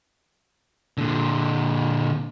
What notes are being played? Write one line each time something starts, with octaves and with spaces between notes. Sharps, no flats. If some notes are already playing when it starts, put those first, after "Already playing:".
A#2 D3